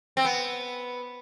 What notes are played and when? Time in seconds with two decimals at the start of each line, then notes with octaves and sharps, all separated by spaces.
0.17 C4
0.25 B3